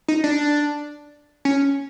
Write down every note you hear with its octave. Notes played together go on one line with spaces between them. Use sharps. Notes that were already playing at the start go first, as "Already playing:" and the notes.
D#4
D4
C#4